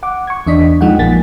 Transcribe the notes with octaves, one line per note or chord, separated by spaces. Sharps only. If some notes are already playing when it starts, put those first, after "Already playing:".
F#5 D6
C#6 G#6
E2 D4 D#5 B6
F3 G#3 D#4 F#5 G5
A#1 A#3 G#5 A6 B6